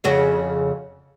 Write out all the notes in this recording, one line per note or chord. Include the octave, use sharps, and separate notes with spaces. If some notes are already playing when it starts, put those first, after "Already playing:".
F2 C#3 F#4